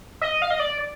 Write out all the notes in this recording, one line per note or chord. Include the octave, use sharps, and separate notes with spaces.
D#5
F5
D#5
D5